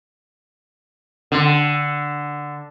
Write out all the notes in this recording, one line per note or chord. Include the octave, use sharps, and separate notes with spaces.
D3